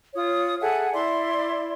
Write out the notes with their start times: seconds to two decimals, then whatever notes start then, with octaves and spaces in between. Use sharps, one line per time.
0.15 F4 C#5 D#6
0.60 G#4 A4 E5 F#5
0.93 E4 D5 E5 C6